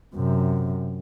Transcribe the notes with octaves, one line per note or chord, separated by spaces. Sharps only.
F#2 C3